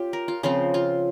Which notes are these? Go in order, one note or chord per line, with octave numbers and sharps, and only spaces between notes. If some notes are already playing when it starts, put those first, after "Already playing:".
Already playing: C#4 F4 G4
A#4
F4
C#3 F3 C4 F4
F4